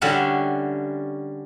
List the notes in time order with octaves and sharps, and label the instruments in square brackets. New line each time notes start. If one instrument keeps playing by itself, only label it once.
[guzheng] D3 G3 C#4 F#4 E5 A5